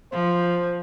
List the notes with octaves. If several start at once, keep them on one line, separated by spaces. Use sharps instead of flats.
F3 C5